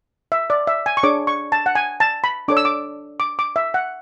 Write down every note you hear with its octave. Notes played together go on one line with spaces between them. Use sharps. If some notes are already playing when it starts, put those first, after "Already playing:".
E5
D5
E5
G#5
C#6
D4 G#4 C#5 D6
C#6
A5
F#5
G#5
A5
B5
D4 A4 C#5 D6
E6
D6
D6
D6
E5
F#5